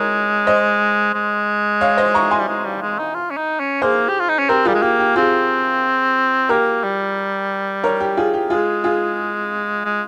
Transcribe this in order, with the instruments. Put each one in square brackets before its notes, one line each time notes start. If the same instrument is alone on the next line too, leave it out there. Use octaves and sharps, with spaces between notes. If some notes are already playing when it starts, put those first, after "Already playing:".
Already playing: [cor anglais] G#3 [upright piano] A#4 C#5
[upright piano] C5 D#5
[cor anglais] G#3
[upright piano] C#5 F5
C5 D#5
A#5 C#6
G#5 C6
[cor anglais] G3
G#3
G3
G#3
D#4
F4
C#4
D#4
C#4
[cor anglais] A#3 [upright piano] G#4 C5
[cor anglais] G4
F4
D#4
C#4
[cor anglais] C4 [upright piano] G4 A#4
[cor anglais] G3 [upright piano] F4 G#4
[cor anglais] G#3
[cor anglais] A#3 [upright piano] G4
[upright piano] G4
[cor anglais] C4 [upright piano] F4 G#4
[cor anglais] A#3 [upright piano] G4 A#4
[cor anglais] G3
[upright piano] A#4 C#5
G4
F4 G#4
G4
[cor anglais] G#3 [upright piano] F4 G#4
[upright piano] F4 G#4
[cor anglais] G#3